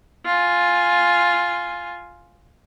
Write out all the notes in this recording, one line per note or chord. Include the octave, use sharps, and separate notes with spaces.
F4 G#5